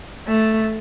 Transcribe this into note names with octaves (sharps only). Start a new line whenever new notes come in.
A3